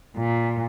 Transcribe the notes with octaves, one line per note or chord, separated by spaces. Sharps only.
A#2